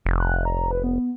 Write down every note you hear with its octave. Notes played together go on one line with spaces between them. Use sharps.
F1
F#6
A#5
B4
B3